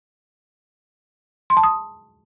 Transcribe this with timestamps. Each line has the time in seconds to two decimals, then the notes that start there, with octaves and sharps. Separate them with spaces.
1.50 C6
1.57 A5
1.64 D#6